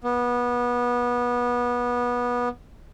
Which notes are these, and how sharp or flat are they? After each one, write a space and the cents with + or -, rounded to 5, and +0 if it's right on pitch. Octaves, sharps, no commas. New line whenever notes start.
B3 -25